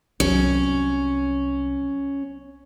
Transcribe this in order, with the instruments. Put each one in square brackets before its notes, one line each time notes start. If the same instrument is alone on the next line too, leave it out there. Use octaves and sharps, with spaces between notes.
[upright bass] C2 F#3 [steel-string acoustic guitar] C#4